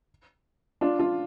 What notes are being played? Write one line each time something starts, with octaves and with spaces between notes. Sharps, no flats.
D4 F4
D4 F4